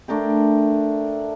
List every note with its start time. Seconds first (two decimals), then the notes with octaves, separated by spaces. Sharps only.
0.08 A3 D4 A#4 G5